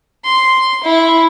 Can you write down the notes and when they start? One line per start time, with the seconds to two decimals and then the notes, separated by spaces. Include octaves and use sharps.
0.25 C6
0.84 E4